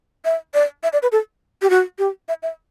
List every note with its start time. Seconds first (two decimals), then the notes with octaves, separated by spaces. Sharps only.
0.25 E5
0.54 D5
0.83 E5
0.93 D5
1.03 B4
1.12 A4
1.62 G4
1.70 F#4
1.99 G4
2.29 E5
2.43 E5